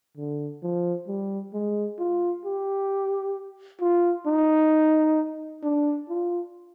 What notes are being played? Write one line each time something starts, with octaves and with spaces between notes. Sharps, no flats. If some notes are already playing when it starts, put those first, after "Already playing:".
D3
F3
G3
G#3
F4
G4
F4
D#4
D4
F4